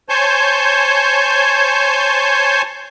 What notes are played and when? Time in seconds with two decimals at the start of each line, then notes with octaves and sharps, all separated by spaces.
0.09 C5 C#5 G#5 A5 G6